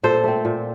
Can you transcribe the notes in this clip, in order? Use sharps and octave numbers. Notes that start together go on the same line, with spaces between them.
A#2 A4 C5
A3 C4
A#2